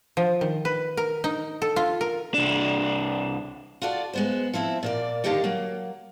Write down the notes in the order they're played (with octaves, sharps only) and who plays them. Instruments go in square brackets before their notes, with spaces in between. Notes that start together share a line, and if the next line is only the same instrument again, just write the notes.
[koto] F3
D#3
B4
A#4
D#4
A4
F4
A#4
[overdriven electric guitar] C2 D4
[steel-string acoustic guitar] F4 F#4 A4 D5
G#3 B3 C5
F3 C4 E4 E5
A#2 A#3 D5
D3 D#3 A#3 D#4 G4 A4
F#3 A#3